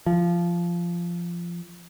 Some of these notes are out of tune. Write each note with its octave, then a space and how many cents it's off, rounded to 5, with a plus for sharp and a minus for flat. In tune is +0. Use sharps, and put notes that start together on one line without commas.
F3 -15